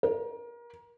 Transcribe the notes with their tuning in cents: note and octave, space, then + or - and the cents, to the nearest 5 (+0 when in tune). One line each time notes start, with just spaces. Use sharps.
A#4 +30